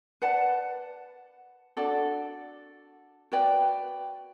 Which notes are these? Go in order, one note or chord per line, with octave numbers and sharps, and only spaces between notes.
B4 D5 F#5 A5
D4 F#4 A4 D5
F#4 B4 D5 G5